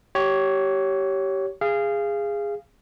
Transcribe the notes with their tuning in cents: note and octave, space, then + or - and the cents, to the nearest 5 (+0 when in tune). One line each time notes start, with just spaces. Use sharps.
G4 -20 C#5 +5
G#4 -15 F5 -20